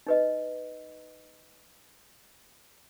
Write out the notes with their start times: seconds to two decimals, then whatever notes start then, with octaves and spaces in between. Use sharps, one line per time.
0.07 D#4 B4 D#5